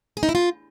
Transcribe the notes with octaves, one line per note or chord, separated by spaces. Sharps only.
G#4
D#4
E4
F4